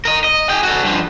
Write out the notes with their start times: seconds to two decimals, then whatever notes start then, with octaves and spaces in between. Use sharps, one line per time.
0.05 A#4 D#5
0.24 D#5
0.49 G#4 G5
0.63 F#4 A4
0.84 G2 F3